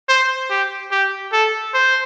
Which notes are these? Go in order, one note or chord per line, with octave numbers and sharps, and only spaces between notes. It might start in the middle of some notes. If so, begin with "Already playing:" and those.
C5
G4
G4
A4
C5